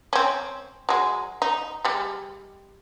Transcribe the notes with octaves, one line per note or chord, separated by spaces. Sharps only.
C4 C#4
F#3 G#3
D#4
G3 G#3